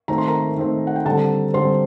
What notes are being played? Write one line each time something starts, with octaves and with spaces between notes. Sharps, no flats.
D#3 A3 C4 A#5
C6
A#4 A#5
D#3 A3 C4
F#5
G5
D3 G3 C4 A4 A5
D3 G3 C4 C5 C6